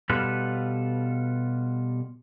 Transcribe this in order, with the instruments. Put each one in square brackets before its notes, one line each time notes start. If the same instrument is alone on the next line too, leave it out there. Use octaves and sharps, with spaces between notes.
[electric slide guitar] B2 G3 F4 A4 B4